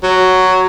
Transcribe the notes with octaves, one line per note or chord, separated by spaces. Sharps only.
F#3